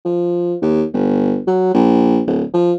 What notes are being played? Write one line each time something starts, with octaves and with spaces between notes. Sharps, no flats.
F3
D#2
G1
F#3
A#1
D1
F3